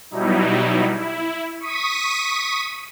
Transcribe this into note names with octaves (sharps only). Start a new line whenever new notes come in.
B2 F#3 G3 D#4 E4
E4
C#6 D#6 B6 D#7